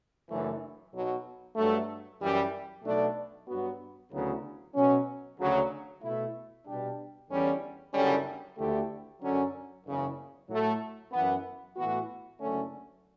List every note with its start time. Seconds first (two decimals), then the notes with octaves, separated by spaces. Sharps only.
0.28 F#1 F#2 E3 A3 D4
0.91 B1 B2 F#3
1.55 G2 F#3 A3
2.20 F#2 E3 G3
2.83 B1 B2 A3 D4
3.48 G2 F#3 B3 F#4
4.11 D2 C#3 F#3 B3 E4
4.74 B2 F#3 C#4
5.38 D2 C#3 F#3
6.02 B2 A3 E4
6.66 B2 G3 D4 G4
7.29 E2 D3 G3 C#4
7.93 F#1 F#2 D3 G3 C#4
8.57 D2 D3 A3 E4 G4
9.21 F#2 D3 F#3 C#4
9.84 F#1 E2 C#3
10.49 A2 F#3 A3
11.12 F#2 E3 B3
11.76 A2 E3 B3 F#4
12.39 F#1 F#2 D3 A3 C#4